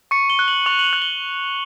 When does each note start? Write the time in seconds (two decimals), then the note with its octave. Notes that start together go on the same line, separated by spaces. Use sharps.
0.11 C#6 C#7
0.30 G7
0.39 F#6
0.48 F#7
0.66 C#6 F7
0.79 F#7
0.84 F7
0.93 F#6
1.02 G7